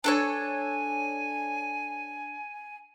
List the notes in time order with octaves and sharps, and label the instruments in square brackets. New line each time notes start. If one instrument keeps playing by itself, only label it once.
[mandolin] D4 A4 C#5 [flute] G#5